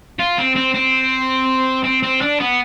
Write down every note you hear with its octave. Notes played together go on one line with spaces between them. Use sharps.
F4
C4
C4
C4
C4
C4
D4
B3